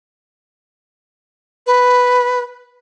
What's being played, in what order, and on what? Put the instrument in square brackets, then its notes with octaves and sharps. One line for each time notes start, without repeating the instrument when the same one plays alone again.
[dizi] B4